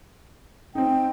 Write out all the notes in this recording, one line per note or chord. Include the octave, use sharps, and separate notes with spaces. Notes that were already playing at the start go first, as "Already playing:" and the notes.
C4 D#4 G5